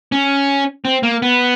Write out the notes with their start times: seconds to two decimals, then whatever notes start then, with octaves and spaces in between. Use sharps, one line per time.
0.12 C#4
0.85 C4
1.03 A#3
1.22 B3